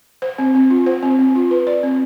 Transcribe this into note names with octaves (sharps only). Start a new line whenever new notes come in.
C5
C4
C4
F4
C5
C4
C4
F4
B4
D5
C4